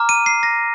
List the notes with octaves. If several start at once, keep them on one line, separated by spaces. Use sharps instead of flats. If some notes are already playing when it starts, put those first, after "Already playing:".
Already playing: A#5 D6 F6
D#7
C7
A#6